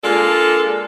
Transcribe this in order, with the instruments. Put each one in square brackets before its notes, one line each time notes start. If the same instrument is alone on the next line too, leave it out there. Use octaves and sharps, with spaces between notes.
[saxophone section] G#3 A#3 D4 F4 A4